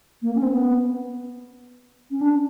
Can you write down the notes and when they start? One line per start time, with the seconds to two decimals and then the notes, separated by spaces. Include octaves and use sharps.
0.22 A#3
0.35 C#4
0.43 C4
0.51 B3
2.11 C#4
2.21 D4